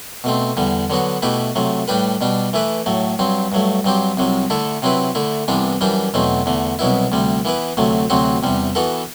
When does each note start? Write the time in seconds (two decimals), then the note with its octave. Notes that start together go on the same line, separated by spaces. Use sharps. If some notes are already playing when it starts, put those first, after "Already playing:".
0.24 B2 A3 C4
0.57 E2 D3 G3
0.90 D3 F#3 B3 F#4
1.22 B2 A3 E4 G4 B4
1.55 C3 F#3 A3
1.88 A2 G3 D4 G4 B4
2.21 B2 G3 D4
2.53 E3 A3 E4 B4
2.86 A2 F#3 A3
3.19 G2 F#3 C4
3.52 G2 F#3 A3
3.84 G2 F#3 C4 G4
4.17 C2 C3 F#3
4.50 D3 A3 E4 A4
4.82 C3 F#3 C4 E4 B4
5.15 D3 A3 E4
5.48 C2 C3 E3 B3 D4
5.81 F#2 E3 G3 D4 G4
6.14 E2 B2 F#3 A3 C4
6.46 E2 D3 A3
6.79 C2 B2 F#3 B3 E4
7.12 D2 C3 G3
7.45 E3 B3 E4 B4
7.77 D2 C3 F#3 A3
8.10 D2 C3 F#3 C4 F#4
8.43 E2 C3 G3
8.75 E3 B3 F#4 A4